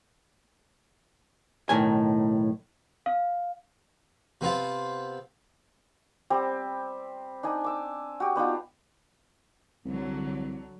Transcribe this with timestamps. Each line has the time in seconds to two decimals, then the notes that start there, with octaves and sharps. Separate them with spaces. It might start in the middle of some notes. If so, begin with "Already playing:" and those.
1.69 B1 A2 D#3 G#5
3.06 F5
4.41 C3 B3 C4 F4
6.30 G3 C4 G4
7.43 D4 D#4 G#5
7.64 D6 E6
8.20 F#4 G4
8.36 B3 D4 D#4 F4
9.85 C2 D3 F#3